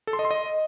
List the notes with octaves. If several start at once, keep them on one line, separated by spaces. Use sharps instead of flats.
A4
C6
D#5
C6
D#5